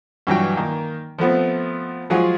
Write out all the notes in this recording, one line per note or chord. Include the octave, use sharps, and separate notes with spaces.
G2 E3 F#3 G5
D#3 A#3
F3 A3 B3 C4
F3 F#3 G#3 F4 G#4 F#5